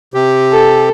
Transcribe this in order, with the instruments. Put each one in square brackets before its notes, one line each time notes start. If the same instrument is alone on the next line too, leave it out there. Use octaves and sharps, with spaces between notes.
[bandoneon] C3 G4
[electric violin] A4